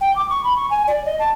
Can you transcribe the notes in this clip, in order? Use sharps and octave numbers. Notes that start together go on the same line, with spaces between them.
G5
D6
C#6
B5
C#6
G#5
D5
D#5
A5